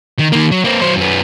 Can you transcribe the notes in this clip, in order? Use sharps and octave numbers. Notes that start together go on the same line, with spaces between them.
D#3
D#3 A#3
F#3
A#3 C4
F#3 C5
F#2 B3